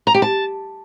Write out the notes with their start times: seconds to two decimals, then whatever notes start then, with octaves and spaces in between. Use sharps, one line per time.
0.07 A#5
0.14 G4
0.22 A5